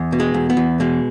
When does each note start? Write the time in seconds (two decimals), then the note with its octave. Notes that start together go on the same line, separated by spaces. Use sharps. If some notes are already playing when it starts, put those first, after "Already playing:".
Already playing: E2
0.12 B2
0.20 G#3
0.34 E2
0.50 B3
0.57 E2
0.80 B2 G#3